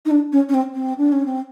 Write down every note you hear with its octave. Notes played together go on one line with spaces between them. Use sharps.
D#4
D4
C#4
C#4
C4
C4
D4
C#4
C4